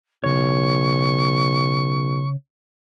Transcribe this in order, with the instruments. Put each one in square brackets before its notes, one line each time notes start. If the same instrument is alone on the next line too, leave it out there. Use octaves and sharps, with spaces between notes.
[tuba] B1 [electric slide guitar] C#3 C#5 [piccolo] C#6